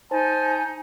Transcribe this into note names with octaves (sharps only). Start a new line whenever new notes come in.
D#4 C5 G#5 A5